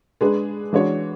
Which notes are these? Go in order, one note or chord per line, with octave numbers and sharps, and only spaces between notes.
G#3 D4 G#4 B4
E3 G#3 D4 F#4 C#5